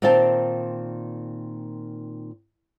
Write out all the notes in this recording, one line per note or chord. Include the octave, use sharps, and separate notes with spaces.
A#2 D#3 C4 F5 G5 A5